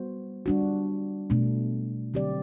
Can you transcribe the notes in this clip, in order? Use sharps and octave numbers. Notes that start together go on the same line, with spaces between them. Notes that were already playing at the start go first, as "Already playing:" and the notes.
Already playing: G3 B3 F#4 C5
G3 D4 F#4
B2 A3 D4
D3 F#3 C4 G4 D5